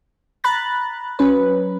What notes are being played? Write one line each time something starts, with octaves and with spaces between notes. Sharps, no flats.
A#5 B5 F#6 A6
F#3 C#4 B4